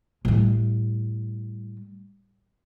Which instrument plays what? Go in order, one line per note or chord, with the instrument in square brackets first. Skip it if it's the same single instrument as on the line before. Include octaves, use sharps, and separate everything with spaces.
[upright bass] A2 G3